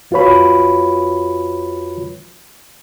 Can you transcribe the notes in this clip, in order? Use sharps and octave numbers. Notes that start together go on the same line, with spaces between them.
F2 F4 F#4 B4 C#5 B5